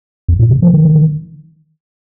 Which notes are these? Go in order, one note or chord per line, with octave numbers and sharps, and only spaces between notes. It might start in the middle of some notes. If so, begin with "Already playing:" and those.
F2
A#2
C3
F3
D#3
D#3
D#3